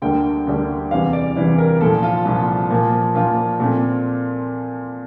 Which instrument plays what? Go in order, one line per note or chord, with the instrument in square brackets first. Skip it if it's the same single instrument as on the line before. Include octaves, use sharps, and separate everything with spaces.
[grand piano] D2 D3 G3 A#3 G5
D2 D3 G3 A#3
E2 C3 E3 G3 F5
D5
E2 C3 E3 G3
A#4
C2 A#2 F3 A4
F4
C2 A#2 F3
A#2 F3 A#3
A#2 F3 A#3 F4
A#2 A3 C4